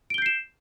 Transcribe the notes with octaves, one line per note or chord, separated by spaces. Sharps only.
G6 C7 D7 E7 G7